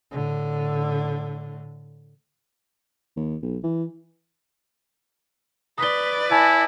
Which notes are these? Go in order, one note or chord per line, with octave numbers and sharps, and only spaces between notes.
A2 D3
D#2
B1
E3
B4 D5 D#6 B6 G7
E4 G#5 A5